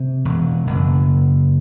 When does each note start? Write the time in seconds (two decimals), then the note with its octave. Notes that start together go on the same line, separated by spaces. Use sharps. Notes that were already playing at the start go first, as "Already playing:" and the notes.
Already playing: C3
0.25 E1
0.67 F#1